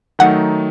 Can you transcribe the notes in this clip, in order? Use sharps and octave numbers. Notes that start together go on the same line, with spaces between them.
D#3 F#3 A3 D#4 F#5